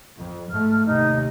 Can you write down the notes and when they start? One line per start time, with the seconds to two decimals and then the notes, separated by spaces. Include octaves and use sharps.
0.17 F2
0.50 G#2 A3 F6
0.86 D#2 C3 D#4